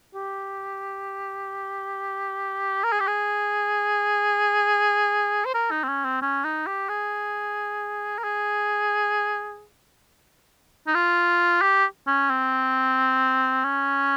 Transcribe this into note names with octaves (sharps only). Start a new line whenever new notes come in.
G4
A#4
G#4
G4
G#4
C5
A#4
D#4
C4
C#4
C4
C#4
D#4
G4
G#4
A#4
G#4
D#4
F4
G4
C#4
C4
C#4